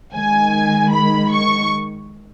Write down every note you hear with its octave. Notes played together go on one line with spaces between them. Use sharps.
D#3 G#3 G#5
B5
C#6